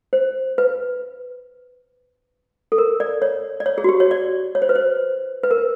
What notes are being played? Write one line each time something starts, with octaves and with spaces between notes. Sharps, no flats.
C5
B4
A4
A#4
D5
C#5
D5
C#5
G#4
F#4
G4
C#5
D5
C#5
C5
B4
C5
B4
A#4
B4